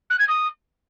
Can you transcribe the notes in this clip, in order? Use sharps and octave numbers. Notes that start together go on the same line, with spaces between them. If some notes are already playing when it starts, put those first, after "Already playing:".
F#6
G#6
D#6